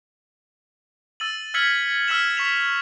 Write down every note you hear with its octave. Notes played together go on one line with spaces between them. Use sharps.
E6 A6 D#7 F#7
E6 F6 G#6 B6 C#7 F#7
E6 F6 G#6 B6 E7 F#7
C#6 B6 F7